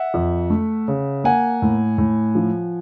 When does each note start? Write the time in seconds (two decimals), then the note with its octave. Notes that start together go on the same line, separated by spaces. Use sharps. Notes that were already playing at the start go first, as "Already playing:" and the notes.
Already playing: E5 F#5
0.14 F2
0.50 A3
0.88 C#3
1.24 A#3 F#5 G#5
1.62 A2
1.98 A2
2.35 F3